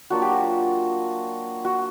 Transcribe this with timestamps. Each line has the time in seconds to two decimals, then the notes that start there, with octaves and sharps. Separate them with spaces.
0.10 F#3 A#3 D4 F4 F#4
0.22 G4
0.32 F#4
1.65 F#4